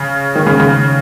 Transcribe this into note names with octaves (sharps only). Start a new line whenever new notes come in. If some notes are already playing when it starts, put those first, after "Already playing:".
Already playing: C#3
D#3
C#3
C#3